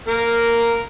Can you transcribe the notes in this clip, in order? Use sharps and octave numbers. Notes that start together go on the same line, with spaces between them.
A#3 A#4